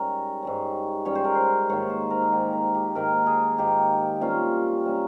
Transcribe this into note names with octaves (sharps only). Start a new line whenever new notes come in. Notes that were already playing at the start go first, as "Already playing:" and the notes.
Already playing: G#2 G3 C#4 A#4
G#2 G3 C#4
G#2 G3 C#4 C#5
C5
A#4
C5
G#2 D#3 A#3 C#5
C5
A#4
G#4
G#2 D#3 A#3 G4
A#4
G4
G#2 D#3 A#3 A#4
G#4
G#2 D#3 A#3 G4
C3 G3 A#3 C#4 F4
C3 G3 A#3 C#4